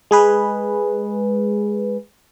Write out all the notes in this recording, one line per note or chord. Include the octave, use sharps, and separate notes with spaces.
G#3 G#4 B4